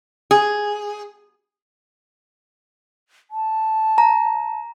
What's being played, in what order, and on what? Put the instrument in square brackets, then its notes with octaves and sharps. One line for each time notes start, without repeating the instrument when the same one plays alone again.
[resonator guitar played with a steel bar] G#4
[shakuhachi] A5
[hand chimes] A#5